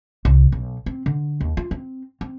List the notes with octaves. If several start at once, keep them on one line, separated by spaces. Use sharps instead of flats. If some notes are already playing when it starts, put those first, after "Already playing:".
C2
B1
C4
D3
D#2
F4
C4
C4